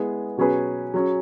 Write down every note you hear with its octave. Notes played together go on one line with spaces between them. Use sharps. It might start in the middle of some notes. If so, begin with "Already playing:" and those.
Already playing: G#3 B3 E4 G#4
B2 F#3 C#4 G#4 B4
F#3 C#4 G#4